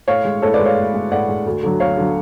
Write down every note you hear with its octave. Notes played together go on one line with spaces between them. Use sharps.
A2 C#5 F5
G#3
A2 A4 C#5
B4 D5
G#3
C#5 F5
A2
G#3
A2 D5 F#5
G#3
D2
D3 F#3
D2 C#5 F5
D3 F#3